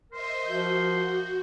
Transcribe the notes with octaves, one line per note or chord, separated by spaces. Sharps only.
A#4 C5 D#5 E5 C6
F3 F#4 G6